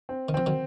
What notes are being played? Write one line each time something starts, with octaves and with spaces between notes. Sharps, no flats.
C4
D#3
F3 C4
D#3 F#3